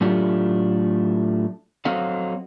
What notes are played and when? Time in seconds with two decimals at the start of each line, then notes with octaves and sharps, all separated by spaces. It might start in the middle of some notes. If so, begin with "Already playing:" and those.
0.01 A2 F#3 A3 D4 F4 G4
1.85 F#3 C4 A4 D#5 F5 F#5